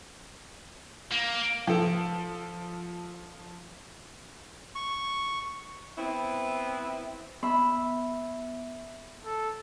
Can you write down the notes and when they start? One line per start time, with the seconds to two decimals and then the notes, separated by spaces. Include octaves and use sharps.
1.12 A#3
1.67 F3 A4
4.75 C#6
5.98 B3 C4 E4
7.43 B3 E5 B5
9.24 A4